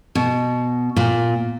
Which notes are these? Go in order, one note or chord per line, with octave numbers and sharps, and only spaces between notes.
B2
A#2